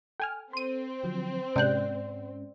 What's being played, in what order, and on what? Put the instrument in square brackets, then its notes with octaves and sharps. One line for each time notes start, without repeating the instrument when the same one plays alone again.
[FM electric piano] A4 [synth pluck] G5 G#5 F6
[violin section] C4 [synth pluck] C6 D#7
[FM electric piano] D3 F3 F#3
[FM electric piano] G#2 G#3 C#4 [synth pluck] C3 F#6 [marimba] D5 G6